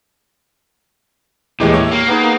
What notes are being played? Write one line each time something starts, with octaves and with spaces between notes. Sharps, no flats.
D#1 A2 E3 G#3 G4
C#5
A#3
B3 D#4 G#4